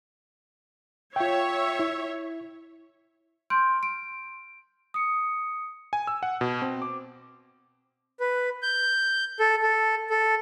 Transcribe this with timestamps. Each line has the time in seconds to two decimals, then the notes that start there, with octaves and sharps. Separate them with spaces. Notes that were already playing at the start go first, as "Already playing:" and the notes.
1.16 F4 C#5 E5 G5
1.79 E4
3.50 C6 F6 G6 D7
3.83 D7
4.94 D#6 C#7
5.93 G#5
6.07 E6
6.23 F#5
6.41 B2
6.62 C4
6.82 D6
8.20 B4
8.62 G6
9.39 A4
9.63 A4
10.10 A4